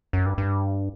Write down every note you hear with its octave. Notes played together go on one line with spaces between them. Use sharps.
F#2
G2
G2